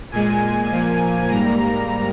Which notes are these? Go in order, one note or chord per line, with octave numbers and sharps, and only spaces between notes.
A#2 G#3 G#5
A#2 F3 A#3
G#2 G3 A#3 A#5